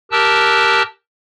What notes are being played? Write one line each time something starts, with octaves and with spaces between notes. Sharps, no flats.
G4 A#4 A5 E6 F#6